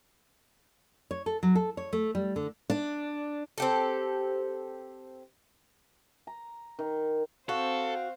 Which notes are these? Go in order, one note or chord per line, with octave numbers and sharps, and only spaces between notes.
C#5
A4
F#3
A4
C#5
A3
G3
D3
D4
C4 G4 A4
A#5
D#3
C4 F#4 A4 C5 F5